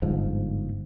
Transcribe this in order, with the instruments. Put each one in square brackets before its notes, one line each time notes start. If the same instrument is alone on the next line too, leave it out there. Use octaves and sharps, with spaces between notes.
[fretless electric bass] G1 G#2 F3